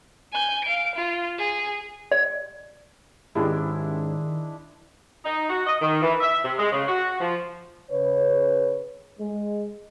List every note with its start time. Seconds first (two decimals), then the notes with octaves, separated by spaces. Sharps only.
0.33 G#5 G6
0.64 F5 D7
0.95 F4
1.38 G#4
2.12 D5
3.35 G#2 D#3 G#3 C#4 D4 E4 G4 G#4
5.25 D#4
5.49 F#4
5.67 D#5
5.81 D#3
6.02 E3
6.21 E5
6.44 C3
6.59 G#3
6.72 C#3
6.89 F#4
7.20 F3
7.90 C#3 B4 C#5
9.18 G#3